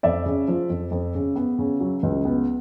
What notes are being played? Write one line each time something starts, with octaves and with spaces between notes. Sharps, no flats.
F2 D5 E5
C#3
F3
F2
F2
C#3
B3
C#3
F#3
C#2
B3